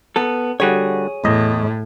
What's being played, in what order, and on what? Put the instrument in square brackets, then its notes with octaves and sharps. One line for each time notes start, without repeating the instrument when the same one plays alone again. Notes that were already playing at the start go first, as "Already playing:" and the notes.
[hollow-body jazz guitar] B3 A4
[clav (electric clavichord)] D3 G3 F#4 [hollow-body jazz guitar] G#4 C#5
[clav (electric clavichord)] E2 D#5 [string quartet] A2